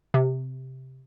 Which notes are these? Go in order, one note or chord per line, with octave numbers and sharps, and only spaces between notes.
C3